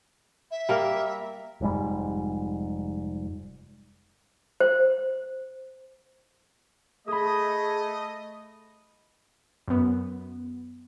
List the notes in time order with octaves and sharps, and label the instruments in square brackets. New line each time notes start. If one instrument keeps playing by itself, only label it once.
[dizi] E5
[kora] G3 A#3 A#4
[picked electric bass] F1 G#2 G3
[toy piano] C5
[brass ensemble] A3 D#5 [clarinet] G#4 [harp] B5 D#6
[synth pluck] F#2 B3